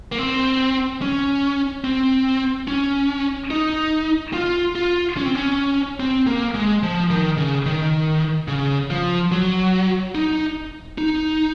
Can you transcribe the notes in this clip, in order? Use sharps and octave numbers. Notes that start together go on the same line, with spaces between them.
A#3
C4
C#4
C4
C#4
D#4
F4
F4
C#4
C4
C#4
C4
A#3
G#3
F3
D#3
C#3
D#3
C#3
F3
F#3
D#4
D#4